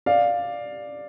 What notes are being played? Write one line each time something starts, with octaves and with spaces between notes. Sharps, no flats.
D5 F5